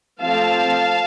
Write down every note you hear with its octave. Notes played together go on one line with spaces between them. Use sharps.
F3 A3 C4 F5 A5